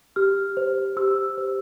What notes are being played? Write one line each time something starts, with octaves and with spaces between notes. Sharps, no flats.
G4 F6
C5
G4 E6
C5